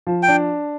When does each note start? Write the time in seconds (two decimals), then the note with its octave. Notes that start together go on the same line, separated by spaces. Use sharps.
0.07 F3
0.23 G5
0.28 D4